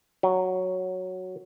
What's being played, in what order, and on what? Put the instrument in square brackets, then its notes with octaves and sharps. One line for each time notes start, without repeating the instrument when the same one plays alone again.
[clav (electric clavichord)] F#3